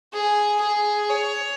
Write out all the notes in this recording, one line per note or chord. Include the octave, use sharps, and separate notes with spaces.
G#4
G#4
C#5